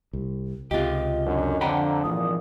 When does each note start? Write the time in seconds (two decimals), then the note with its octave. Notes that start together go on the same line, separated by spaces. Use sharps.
0.13 C2
0.71 C#2 C3 F4 G4 D#5
1.26 F#2 D3
1.61 F2 D3 F#5 G5 A#5 B5
2.04 G#1 A#2 E3 F3 D#6